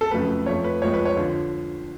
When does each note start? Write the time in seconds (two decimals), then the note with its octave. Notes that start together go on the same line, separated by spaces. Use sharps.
0.01 A4
0.11 F2 C#3 F#3 A3 B4
0.46 F2 F3 A3 C#5
0.64 B4
0.82 F2 F3 G#3 C#5
0.94 B4
1.05 C#5
1.17 D3 F3